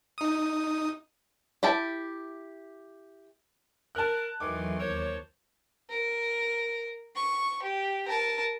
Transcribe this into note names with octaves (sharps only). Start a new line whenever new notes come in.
D#4 D#6
E4 G4 A5
A#4 A5 F#6
E2 D#3 E3 F#3 A3 C6 D6
D#2 A#4 C5 C#5 A5
A#4
C#6
G4
A#4 A5